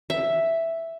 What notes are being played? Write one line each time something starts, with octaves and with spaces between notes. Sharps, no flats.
E5